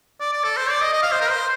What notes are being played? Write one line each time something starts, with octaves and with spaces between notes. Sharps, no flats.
D5
D5
A4
C5
D5
D#5
D#5
F5
C5
A#4
C5